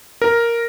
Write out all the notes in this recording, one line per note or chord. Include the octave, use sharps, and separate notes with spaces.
A#4